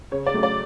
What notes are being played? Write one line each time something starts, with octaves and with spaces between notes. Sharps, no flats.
C#3 C#5
D5
F#3 A3
D5